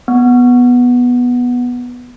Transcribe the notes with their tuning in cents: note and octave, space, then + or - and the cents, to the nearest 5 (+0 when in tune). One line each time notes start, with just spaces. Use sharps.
B3 -10